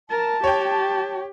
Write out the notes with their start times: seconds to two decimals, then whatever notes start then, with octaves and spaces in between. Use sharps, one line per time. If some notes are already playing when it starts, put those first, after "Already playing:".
0.10 A#4 A5
0.44 G4 C#5 G5